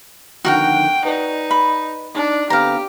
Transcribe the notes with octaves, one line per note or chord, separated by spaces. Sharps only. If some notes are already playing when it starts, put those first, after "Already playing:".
F2 D3 D#3 F#4 A#4 F#5 G5
D#4 B4 D5 D#5
B5
D4 D#4
D3 B3 C4 G4 F5 A#5